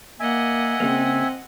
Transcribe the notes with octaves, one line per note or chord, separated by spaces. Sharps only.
A#3 D#5 E5 F#5 G#5
C#3 G#3 A#3 C4